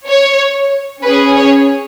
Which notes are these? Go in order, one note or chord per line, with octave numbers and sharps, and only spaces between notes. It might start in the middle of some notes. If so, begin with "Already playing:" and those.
C#5
C#4 G#4 B4
C#5